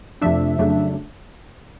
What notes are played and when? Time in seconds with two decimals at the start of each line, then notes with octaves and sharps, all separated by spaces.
0.21 F2 C3 F3 A3 D4 E5
0.59 F2 C#3 F#3 A3 D4